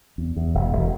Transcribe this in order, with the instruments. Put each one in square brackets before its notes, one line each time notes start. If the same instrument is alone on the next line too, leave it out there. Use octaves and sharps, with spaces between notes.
[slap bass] E2
E2
E1
E1